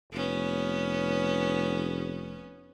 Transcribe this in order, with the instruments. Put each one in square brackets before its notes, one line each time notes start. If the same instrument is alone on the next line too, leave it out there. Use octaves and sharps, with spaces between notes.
[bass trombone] F1 [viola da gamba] B3 C#4